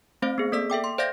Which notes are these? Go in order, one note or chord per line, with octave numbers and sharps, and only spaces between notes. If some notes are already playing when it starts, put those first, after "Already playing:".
A3 C4 C5 F5
B3 G#4
A#3 A4 D5 E6 B6
A4 E5 G5 D6
C6
C5 D5 E5 F5 G6 A#6